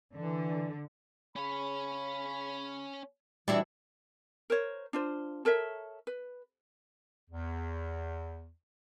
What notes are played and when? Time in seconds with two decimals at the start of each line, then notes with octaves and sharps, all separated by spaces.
0.16 D3 E3
1.36 C#3 C#4 C#5 B5
3.48 D#2 E3 G3 D4 E4 F#4
4.50 A#4 C5 C#5
4.93 D4 F4 C5
5.45 A4 A#4 C#5 E5
6.07 B4
7.30 E2